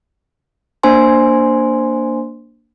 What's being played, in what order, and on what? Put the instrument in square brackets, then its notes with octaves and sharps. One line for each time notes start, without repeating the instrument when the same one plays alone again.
[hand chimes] A#3 D4 C5 G#5 C6